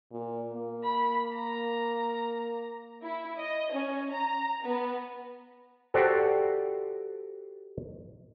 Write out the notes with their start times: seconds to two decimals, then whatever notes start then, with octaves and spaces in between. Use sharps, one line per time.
0.12 A#2
0.53 A#3
0.83 B5
1.35 A#5
3.04 E4
3.40 D#5
3.72 C#4
4.13 A#5
4.65 B3
5.94 F#4 G4 A4 C5 D5